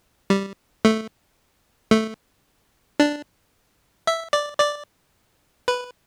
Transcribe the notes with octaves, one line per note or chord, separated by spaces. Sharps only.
G3
A3
A3
D4
E5
D5
D5
B4